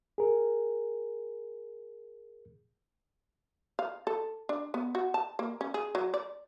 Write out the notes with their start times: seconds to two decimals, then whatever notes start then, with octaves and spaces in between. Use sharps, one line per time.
0.18 G#4 A#4
3.79 F5
4.07 A4
4.49 D4
4.74 B3
4.95 F#4
5.14 A5
5.39 A#3
5.61 C#4
5.74 G#4
5.95 F#3
6.14 D5